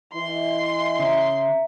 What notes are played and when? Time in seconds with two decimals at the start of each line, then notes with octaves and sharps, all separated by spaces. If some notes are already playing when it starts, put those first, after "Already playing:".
0.14 E3 D#5 C6
0.99 C#3 E5 A#5